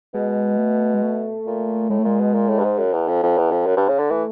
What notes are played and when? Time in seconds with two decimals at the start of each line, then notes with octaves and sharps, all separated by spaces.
0.14 B2 G#3
0.58 A3
0.94 G#3
1.03 A3
1.46 A#2
1.90 A2 G#3
1.99 A3
2.04 A#2 G#3
2.20 B2
2.34 A#2
2.48 A2
2.59 G2
2.64 G#2
2.78 F#2
2.93 E2
3.08 F2
3.23 F2
3.37 E2
3.51 F2
3.66 F#2
3.77 G2
3.89 C#3
3.99 D3
4.10 E3 A3